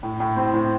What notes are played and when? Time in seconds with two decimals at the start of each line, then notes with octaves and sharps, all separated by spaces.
0.03 A2
0.20 A2
0.37 C4
0.54 A2